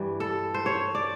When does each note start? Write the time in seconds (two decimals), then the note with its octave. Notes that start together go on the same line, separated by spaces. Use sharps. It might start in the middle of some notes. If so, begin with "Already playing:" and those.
Already playing: G2 E3 G3
0.20 A4
0.54 C5
0.66 C#5
0.95 D5